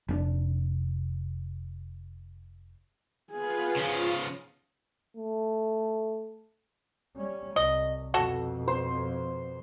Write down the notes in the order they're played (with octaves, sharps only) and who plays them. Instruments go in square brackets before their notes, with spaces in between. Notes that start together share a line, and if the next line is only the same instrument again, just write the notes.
[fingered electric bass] F1 C#4 D4
[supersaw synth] B3 F4 B4 [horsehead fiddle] G#4
[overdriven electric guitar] C#3 F3 [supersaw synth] F4
[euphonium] A3
[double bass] G3 C#4
[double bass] C2 [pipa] D#5
[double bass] F2 B2 [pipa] F#4 A4
[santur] C5